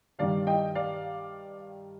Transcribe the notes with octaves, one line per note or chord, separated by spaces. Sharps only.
G2 D#3 G3 D5 F5
D#5 G5
D5 F5